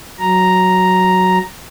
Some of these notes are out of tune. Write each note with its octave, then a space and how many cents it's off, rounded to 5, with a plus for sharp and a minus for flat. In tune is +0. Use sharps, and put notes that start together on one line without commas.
F#3 +0 A#5 +0